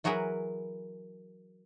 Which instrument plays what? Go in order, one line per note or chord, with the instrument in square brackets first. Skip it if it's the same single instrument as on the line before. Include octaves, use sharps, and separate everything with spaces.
[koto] E3 F#3 F#4 G#4 A#4 B4